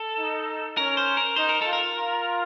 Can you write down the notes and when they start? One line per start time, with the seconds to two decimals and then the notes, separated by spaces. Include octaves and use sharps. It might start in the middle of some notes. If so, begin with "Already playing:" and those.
Already playing: A4
0.19 D#4
0.77 C#4 A#4
0.97 C5
1.17 A#4
1.36 D#4 C5
1.49 A#4
1.61 F4 A4
1.73 A#4
1.96 F4